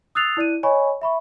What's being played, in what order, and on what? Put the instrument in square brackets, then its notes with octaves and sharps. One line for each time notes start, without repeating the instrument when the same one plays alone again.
[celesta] D#6 E6 F#6 A6 C7 F7
E4 D5 F#6 D#7
C#5 D#5 G#5 B5 C#6
E5 B5 C#6